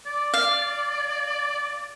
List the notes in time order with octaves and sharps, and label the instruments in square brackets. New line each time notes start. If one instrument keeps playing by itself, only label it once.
[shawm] D5
[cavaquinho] F5